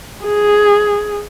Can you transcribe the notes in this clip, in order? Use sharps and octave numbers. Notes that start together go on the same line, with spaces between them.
G#4